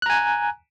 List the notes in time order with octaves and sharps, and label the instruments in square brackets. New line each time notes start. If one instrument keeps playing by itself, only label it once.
[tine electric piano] F#6
A#5
G#5